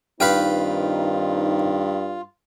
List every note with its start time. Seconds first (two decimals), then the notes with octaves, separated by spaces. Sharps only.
0.20 G2 D#3 C4 D#4 F4 B4 F5 G5